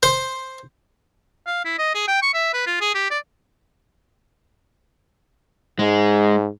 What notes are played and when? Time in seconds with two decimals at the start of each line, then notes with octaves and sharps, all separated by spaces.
0.03 C5
1.47 F5
1.65 E4
1.79 D#5
1.95 G#4
2.08 G5
2.23 C#6
2.34 E5
2.54 B4
2.67 F4
2.81 G#4
2.95 G4
3.11 D5
5.79 G#2 G#3